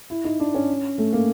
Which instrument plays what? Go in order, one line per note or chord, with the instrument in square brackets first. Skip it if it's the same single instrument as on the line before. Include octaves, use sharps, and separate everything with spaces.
[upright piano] E4
D#4
D4
C#4
A3
A#3